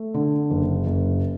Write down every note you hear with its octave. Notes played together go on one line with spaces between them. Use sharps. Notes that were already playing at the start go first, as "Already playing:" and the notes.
Already playing: A3
D3
F#1
F#1